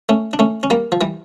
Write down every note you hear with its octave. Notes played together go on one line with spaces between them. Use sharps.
A3 C#4
D4
A3 C#4
C#4
G3 A#3
F3
E3 G3